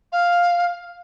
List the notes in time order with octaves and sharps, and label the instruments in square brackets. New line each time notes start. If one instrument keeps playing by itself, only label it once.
[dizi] F5